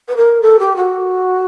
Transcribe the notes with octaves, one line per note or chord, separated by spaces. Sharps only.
B4
A#4
A4
G4
F#4